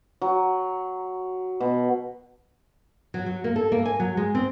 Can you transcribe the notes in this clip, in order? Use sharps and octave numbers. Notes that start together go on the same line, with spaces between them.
F#3
B2
F#3
F#3
A#3
A4
A#3
G#5
F#3
G#3
C4